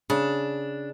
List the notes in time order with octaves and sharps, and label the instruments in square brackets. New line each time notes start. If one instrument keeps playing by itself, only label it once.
[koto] C#3 [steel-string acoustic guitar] D4